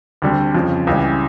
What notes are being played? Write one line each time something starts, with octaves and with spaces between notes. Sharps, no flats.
D2 D3 G3 C4
F2 C#3 F3
C#2 C#3 E3 G3